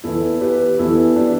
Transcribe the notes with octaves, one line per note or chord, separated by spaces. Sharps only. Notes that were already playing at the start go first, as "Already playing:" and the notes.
E2 E3 B3 E4 A4
G4 B4
E2 E3 B3 E4 A4
D4 G4